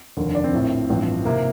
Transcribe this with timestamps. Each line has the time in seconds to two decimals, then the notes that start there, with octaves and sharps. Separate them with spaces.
0.17 F1 D#2 D3
0.35 D4
0.44 C4
0.53 A#1 A2 F3
0.89 A1 G2 F3
1.25 C3 D#3 A#3